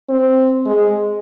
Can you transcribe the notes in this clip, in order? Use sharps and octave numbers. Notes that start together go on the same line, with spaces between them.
C4
G#3